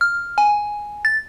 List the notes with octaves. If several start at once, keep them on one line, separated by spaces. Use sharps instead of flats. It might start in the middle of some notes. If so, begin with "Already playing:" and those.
F6
G#5
A6